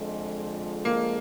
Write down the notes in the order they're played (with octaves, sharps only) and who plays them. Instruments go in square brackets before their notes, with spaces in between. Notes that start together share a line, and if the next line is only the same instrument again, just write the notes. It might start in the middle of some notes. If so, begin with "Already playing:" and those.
Already playing: [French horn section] F2 D3 F3 G#3
[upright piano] A#3